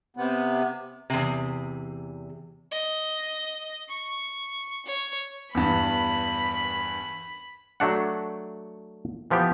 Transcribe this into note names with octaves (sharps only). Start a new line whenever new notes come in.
C3 B3
E2 C3
D#5
C#6
C#5
E2 G2 B5
F#3 A3 D4 F#5
E3 F3 B3 G4